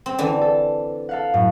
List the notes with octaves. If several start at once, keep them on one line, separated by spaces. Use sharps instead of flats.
C4
D3 E3
A4
A4 F5 F#5
F#2 A2